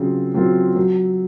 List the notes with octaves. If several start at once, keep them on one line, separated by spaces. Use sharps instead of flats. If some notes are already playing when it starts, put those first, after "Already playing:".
Already playing: C#3 F#3 C4 F4
F#3 C4 F4
F#3